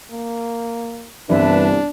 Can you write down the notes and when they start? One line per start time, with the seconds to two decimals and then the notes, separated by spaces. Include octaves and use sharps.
0.12 A#3
1.29 G1 C2 E3 D4 B4 E5 A5